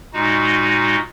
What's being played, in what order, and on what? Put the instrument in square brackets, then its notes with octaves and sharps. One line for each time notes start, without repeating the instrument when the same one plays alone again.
[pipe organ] A#2 G#3 D#4 F#4